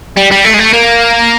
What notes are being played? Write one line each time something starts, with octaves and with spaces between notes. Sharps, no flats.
G3
G3
A3
G#3
A3
A#3